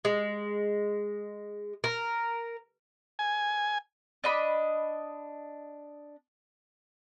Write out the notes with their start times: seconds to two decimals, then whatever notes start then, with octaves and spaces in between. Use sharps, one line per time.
0.05 G#3
1.84 A#4
3.19 G#5
4.24 D4 D#5 B5